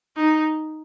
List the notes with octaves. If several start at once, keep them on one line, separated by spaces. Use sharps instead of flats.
D#4